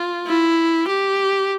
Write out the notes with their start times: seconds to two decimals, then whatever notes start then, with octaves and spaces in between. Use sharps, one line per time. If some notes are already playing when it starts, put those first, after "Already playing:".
Already playing: F4
0.27 E4
0.87 G4